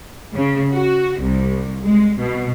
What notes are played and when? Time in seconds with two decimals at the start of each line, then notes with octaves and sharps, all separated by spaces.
0.35 C#3
0.72 F#4
1.21 C2
1.83 G#3
2.19 B2